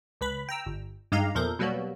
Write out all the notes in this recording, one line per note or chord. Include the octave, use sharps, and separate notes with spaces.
C#2 B4 B5
G5 A#5 E6
G1
G2 G#3 D#4 G4 F5 A#5
E2 A#2 F3 A4 A#4 G6
B2 F#3 G3 A#3 B3 F#4